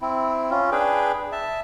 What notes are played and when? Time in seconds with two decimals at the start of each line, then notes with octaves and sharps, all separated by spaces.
0.01 C4 E4
0.51 C#4 F4
0.72 D4 G#4 B4 G5
1.32 E5 A5